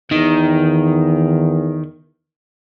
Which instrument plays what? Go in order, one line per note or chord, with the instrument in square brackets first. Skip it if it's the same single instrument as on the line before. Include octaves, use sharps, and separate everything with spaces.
[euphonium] E2 [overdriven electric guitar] D#3